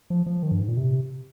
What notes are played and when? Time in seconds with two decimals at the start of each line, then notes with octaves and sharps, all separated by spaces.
0.10 F3
0.26 F3
0.43 D#3
0.51 G2
0.61 G#2
0.68 A#2
0.77 C3